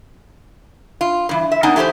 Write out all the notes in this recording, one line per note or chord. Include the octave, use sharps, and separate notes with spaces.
F4
G2 E3
E5
A#3 B3 D4 D#4 F#5 G#5
E3 A3 G4 A4 C5